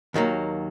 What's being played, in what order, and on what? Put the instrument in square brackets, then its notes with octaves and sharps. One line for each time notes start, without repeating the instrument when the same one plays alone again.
[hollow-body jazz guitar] D#2 D#3 F#3 A#3